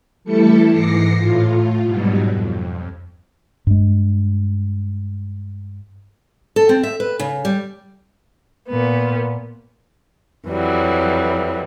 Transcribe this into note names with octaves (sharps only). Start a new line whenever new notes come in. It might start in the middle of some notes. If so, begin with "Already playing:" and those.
E3 G3 A3 E4 A4 C#7
G#2 E3 D6 A#6 C7 C#7
A2 F4
G#2 B2 F#3 G3
F2
G2 G#3
A4
C4
E5
B4
C#3
G3
A#2 B3
F2 E3 F#3 G3